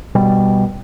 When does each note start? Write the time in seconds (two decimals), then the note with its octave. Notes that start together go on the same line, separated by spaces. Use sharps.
0.15 B2 G3